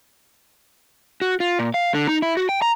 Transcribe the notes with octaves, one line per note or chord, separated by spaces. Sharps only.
F#4
F4
A#2
F5
D3
D#4
E4
F#4
G5
A#5